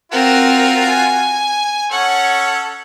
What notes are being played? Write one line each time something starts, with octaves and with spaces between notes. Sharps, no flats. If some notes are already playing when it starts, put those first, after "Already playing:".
C4 F4 F#4 A#4
G#5
C#4 A4 C#5 F#5